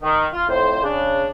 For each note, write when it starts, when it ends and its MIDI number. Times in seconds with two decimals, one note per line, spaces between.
0.02 0.26 51
0.33 0.43 65
0.48 0.80 41
0.48 0.80 45
0.48 0.80 72
0.83 1.27 49
0.83 1.27 62